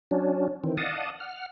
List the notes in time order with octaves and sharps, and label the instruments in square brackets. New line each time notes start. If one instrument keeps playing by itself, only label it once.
[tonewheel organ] F#3 C#4 D4
D#3 E3 C4
D5 D#5 F5 F#5 A5 D#6
F#5 F6